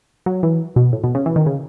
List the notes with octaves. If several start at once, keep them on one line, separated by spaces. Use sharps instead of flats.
F#3
E3
B2
A2
B2
C#3
E3
D#3
C#3